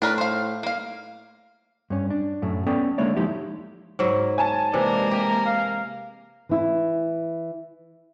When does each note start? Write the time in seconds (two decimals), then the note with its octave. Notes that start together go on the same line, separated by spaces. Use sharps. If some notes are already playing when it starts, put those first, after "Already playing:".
0.02 A2 D4 A#4 B4
0.18 C5 F5
0.63 A#3 F5
1.90 G2 C#4
2.10 D4
2.42 F#2 A2 A3
2.67 B3 C#4 A4 D5 G5
2.98 D3 G#3 A#3 E4 C#5 D5
3.17 F3 G#3 D#4 E4 G4
3.99 G#2 F#3 E4
4.38 G#5 A5
4.74 C3 E3 G#3 A#3 A#4 D5
5.11 G4 A#5
5.46 F5
6.49 E3 E4